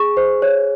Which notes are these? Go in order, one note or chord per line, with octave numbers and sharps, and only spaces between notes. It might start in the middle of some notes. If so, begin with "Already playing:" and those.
Already playing: G#4 C#6
C5
C#5